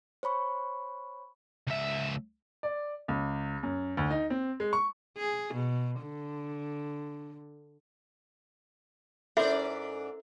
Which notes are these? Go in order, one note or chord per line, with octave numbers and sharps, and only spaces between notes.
C5 C#5 B5 C#6
C#2 E5
D5
C#2
F#2
D2
D#4
C4
G#3
C#6
G#4
B2
D3
G#2 C#4 E4 A4 A#4 C5 D5 E5